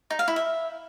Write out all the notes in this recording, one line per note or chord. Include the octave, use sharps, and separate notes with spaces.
D#4
F5
E4
E5